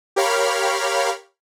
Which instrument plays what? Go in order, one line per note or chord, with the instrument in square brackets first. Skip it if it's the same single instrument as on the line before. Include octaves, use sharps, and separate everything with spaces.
[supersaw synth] G4 A#4 C#5 F5 B5 F6